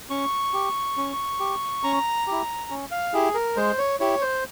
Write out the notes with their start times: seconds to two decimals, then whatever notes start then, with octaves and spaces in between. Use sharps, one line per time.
0.10 C#4 C#6
0.54 G4
0.97 C#4
1.40 G4
1.83 C#4 A#5
2.27 E4 G4
2.70 C#4
2.91 F5
3.14 E4 G4 G#4
3.34 A#4
3.57 G#3 C5
3.78 C#5
4.00 E4 G4 C#5
4.21 C5